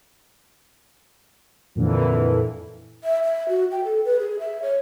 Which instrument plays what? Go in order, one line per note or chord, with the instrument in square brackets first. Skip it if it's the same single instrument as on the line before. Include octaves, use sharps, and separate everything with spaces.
[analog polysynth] F2 A#2 D3 E3
[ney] E5
E5
F#4
G5
A4
B4
G#4
E5
C#5